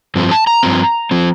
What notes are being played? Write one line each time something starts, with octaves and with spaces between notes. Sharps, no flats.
G2 F3 C4
A5
A#5
G2 F3 C4
F3 C4